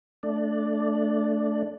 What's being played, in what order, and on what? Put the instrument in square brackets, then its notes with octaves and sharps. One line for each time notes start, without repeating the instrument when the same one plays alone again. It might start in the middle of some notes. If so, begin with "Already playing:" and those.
[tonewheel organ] A3 D4 D5